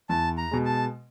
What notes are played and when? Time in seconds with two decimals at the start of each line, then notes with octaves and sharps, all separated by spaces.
0.09 E2 A5
0.38 A#5
0.51 B2 G#3
0.65 A5